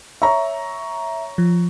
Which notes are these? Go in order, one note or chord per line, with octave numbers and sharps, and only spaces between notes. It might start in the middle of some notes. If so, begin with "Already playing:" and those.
C#5 E5 A#5 C#6
F3